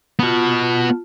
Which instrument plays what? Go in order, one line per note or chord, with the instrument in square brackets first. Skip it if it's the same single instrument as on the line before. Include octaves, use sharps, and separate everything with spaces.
[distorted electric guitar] B3 F#4 [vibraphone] F4 A5